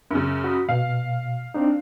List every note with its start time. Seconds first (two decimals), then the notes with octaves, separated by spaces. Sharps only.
0.11 F#2 C#3
0.44 F#4 B5 D#6
0.69 B2 F5
1.54 C4 D4 D#4